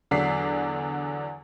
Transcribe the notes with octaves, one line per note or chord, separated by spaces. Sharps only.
E2 D3 F#3 D5 B6 C7